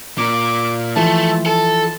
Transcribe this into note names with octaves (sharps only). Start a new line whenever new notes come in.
A#2 D6
E3 F3 A3 A5
A4 A5